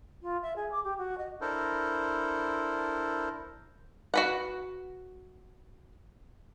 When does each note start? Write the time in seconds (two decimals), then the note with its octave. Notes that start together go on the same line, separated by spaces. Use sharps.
0.22 F4
0.42 E5
0.56 G#4
0.72 D6
0.84 G4
0.98 F#4
1.18 D#5
1.41 D4 E4 A4 A#4 C5
4.14 F#4 B4 F#5